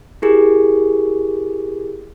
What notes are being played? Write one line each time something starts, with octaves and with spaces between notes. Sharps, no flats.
E4 G4 G#4 A#4